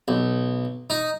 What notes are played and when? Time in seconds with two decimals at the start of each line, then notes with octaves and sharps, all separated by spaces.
0.08 B1
0.90 D#4